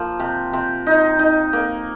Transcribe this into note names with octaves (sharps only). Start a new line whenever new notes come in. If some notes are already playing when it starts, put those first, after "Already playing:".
Already playing: F3 A#3
C3
C3
D#4
D#4
A#3